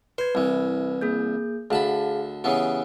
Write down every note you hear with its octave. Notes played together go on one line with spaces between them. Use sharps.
B4 C5 G#6
C2 E3
A#3 G#4 G6
D2 G#4 F5 F#5 A5 B5
C#3 E3 B3 G4